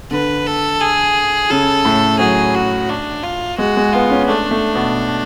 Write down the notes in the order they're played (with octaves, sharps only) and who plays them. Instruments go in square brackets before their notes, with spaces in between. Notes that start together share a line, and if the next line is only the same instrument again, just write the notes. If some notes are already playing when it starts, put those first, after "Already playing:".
[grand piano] D3 [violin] B4
[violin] A4
G#4
[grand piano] C#3 [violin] A4
[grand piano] A2
[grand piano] F#3 [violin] G#4
[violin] F#4
D4
F4
[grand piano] G#3 [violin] F#4
[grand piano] G#3
[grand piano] B3 [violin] F4
[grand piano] C#4
[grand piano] A3 [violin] D4
[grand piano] A3
B2